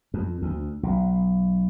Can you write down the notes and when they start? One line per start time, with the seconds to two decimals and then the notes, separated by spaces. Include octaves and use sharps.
0.14 F2
0.42 D2
0.83 B1